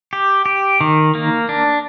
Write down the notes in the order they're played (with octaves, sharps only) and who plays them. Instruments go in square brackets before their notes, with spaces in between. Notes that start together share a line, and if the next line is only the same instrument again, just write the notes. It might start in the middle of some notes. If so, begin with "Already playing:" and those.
[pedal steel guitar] G4
G4
D#3
A#3
D4